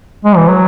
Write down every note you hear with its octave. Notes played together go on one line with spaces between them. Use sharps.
G#3
E3
F#3